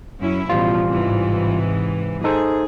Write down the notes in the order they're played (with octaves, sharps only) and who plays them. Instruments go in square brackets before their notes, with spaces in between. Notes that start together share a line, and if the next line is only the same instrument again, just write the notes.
[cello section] F#2 C#4 E4
[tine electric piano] A1 G3 F4 [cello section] B2 F3
[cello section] G#2 C3 E3
[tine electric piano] D#4 A4 C5 [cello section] G#4